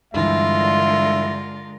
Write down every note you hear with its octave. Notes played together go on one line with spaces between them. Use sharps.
G2 D3 E3 G#3 F4 A#4 E5